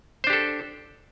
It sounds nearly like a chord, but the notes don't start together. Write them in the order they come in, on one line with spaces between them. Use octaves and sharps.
C5 D4 G4 A4